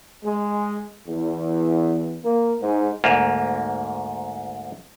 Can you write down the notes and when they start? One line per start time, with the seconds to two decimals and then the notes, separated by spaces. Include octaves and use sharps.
0.24 G#3
1.07 E2
2.23 A#3
2.60 G#2
3.04 D2 G#2 A#3